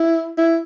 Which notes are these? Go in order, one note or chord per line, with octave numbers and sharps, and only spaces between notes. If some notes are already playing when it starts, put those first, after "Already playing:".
Already playing: E4
E4